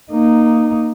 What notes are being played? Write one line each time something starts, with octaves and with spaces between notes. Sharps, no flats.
A#3 D#4